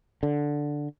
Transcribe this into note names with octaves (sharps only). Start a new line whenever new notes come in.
D3